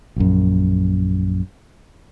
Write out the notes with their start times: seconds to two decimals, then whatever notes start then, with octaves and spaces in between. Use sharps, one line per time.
0.16 A#1 F#2